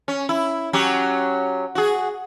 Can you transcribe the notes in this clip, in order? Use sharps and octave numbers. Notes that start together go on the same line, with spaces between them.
C#4
E4
F#3 C#4 G4
F#4 G#4